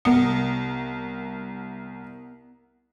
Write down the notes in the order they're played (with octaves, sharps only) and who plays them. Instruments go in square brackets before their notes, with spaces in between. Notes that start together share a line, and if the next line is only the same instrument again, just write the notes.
[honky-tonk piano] C2 A#4 [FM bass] B3